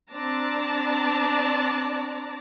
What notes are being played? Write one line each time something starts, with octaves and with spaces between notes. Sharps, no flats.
C4 D4 D5 A5 A#5